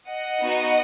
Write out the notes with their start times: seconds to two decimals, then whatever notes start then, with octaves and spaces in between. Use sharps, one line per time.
0.08 D#5 F#5
0.42 B3 D#4 F#4